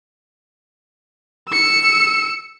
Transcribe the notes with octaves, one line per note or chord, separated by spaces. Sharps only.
E6 C#7